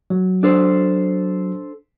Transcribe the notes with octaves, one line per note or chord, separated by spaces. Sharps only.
F#3
D4 A4 C5